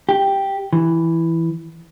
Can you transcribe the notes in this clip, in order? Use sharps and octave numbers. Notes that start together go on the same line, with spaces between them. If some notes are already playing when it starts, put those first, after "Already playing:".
G4
E3